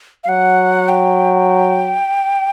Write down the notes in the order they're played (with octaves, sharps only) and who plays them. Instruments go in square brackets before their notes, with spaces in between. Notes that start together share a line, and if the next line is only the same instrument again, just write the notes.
[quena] F5
[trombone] F#3 [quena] F#5
[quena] G5